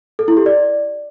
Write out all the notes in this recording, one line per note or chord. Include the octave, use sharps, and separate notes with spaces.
A4
E4
G4
D5